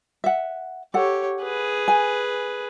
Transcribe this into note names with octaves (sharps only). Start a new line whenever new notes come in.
E5 F#5
G4 A4 C#5 F#5
G#4 B4
G#5